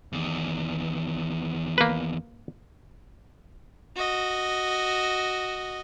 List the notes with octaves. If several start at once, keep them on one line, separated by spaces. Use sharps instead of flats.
E2 D#3
A#3 B4
F#4 D#5